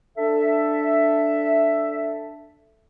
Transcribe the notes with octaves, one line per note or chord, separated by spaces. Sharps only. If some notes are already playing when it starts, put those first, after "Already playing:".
D4 A4 E5